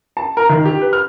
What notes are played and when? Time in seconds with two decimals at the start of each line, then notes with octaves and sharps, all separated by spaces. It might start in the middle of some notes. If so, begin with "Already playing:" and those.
0.17 A5
0.37 A#4
0.49 D#3
0.66 G4
0.81 B4
0.93 F6